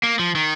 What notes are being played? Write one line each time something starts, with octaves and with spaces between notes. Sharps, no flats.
A#3
F3
D#3